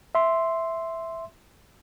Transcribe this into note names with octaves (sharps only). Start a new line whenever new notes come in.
E5 C6